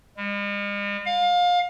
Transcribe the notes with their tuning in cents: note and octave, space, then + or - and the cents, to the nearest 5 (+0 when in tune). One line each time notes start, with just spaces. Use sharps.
G#3 -45
F5 +25